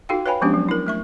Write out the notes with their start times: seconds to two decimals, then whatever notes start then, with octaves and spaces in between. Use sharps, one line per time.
0.09 D#4 F4 F#4 A4 F5 G5
0.26 B4 C#5 F5 G5 G#5 B5
0.41 F3 G#3 B3 C#4 D4 G4
0.54 F#3
0.69 E4 A#4
0.87 A3 E5 C#6